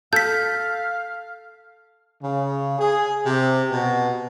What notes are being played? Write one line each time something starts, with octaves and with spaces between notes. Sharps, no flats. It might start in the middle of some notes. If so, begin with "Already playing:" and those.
A4 F5 G6 B6
C#3
G#4
C3
B2